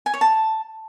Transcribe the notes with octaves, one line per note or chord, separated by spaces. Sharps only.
G#5
C#5
A5